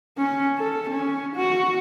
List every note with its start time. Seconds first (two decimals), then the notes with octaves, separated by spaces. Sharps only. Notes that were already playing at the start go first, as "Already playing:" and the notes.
0.18 C#4
0.58 A4
0.90 C#4
1.36 F#4